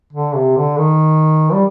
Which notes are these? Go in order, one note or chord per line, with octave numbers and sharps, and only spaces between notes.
D3
C3
D3
D#3
G3